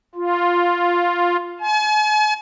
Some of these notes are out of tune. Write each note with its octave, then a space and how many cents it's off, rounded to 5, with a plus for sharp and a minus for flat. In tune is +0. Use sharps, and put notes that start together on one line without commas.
F4 +0
G#5 +40